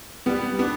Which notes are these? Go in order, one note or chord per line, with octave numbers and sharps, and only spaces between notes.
G3 B3
B3 D4